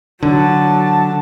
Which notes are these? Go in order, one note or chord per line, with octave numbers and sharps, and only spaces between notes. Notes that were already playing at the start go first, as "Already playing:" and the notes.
D3 F#3 A5